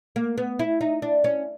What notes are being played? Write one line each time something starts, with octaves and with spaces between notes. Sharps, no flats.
A#3
B3
E4
D#4
D4
C#4